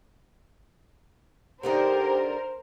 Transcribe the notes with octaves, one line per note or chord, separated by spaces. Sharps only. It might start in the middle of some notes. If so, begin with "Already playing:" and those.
D3 D4 D#4 G4 A#4 C5